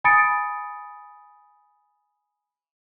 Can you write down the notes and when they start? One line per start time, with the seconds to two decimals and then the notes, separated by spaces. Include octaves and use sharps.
0.04 G#5 B5 D#6 A6 C#7 D7